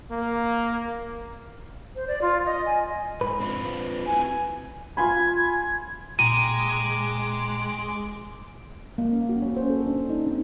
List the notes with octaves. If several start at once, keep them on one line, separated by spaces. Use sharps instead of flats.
A#3
C5
D5
F4
D#5
G#5
G#2 B4
C4 D4 F4
C4 E4 F#4 G#5
F4 G#5 B5 G#6
A#2 G#3 G5 A#5 D6 D#7
A#3
C#4
F#4
C#4
C5
A4
D4
D#4
C4